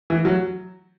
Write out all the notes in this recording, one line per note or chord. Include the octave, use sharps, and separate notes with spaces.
E3
F#3